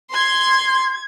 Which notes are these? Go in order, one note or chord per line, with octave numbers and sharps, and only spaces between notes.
C6 G#6